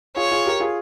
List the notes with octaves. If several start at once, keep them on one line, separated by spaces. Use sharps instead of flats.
F4 G#4 C#5
F4 G#4
G4 A#4
F4 G#4